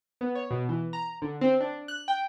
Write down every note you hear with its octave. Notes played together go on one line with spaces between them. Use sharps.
B3
C#5
B2
E3
A#5
D3
C4
D4
F#6
G5